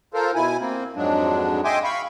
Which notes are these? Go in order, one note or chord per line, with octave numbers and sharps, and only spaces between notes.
F4 A4 A#4 C5
B2 E4 G#5
A#3 C4
F2 G#2 F#3 G#3 D4
D#5 E5 G5 G#5 C6 D6
F5 B5 C#6